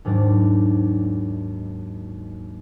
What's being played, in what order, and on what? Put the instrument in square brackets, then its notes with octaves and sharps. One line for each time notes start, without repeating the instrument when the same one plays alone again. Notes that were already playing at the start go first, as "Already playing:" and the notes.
[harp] D#2 G#2 F#3 D4